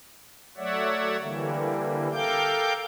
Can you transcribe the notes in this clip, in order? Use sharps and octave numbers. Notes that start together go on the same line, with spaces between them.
F#3 A3 C#5 D5 E5 F#5
D3 E3 G3 A#3
A4 A#4 F5 G5 D6 G6